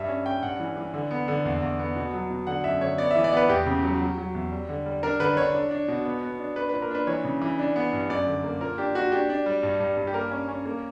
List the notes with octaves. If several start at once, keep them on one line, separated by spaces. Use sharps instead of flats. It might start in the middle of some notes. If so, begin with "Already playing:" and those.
Already playing: G2 E5
C#4
C#4 G5
G2 F#5
E3
E3
D3
B3
D3
E2
E2
B3
B2
F#3
B2
D3 F#5
F#2 E5
D3 C#5
B3 D5
E3 E5
D5
B3 B4
E2 G4
C#3
F#3
F#3
F#3
E2
G3
D3
G3
D4 A#4
D3 B4
D3 C#5
D4
D4
B2
B3
B3
D4
D4 B4
A#2 B4
A#4
D4 B4
E3 C#5
C#3
E3
D4
B3
G2
F#2 D5
D3
A#3
A#2 A#4
D4 G4
D4 F#4
D4 G4
D4
G3
G2
G2
G2
G4
A#3 A#4
C#4
C#4
A#3